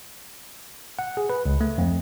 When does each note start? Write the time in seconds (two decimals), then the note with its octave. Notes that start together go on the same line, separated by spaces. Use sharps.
0.99 F#5
1.17 G#4
1.30 B4
1.46 C#2
1.61 A3
1.78 F2